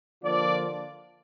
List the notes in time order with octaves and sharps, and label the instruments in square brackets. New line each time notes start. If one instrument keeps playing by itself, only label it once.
[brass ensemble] D3 F3 A#3 D4 F4 D5